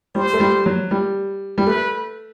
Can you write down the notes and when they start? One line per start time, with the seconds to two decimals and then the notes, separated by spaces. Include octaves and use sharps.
0.15 G3 C5
0.33 A3
0.40 G3
0.66 F#3
0.91 G3
1.58 G3
1.67 A3 B4